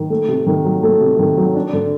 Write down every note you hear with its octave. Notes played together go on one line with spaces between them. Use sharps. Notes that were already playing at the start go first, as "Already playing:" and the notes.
Already playing: D#3
A3
C3
D#3
F#3
A3
C3
D#3
F#3
D4
D3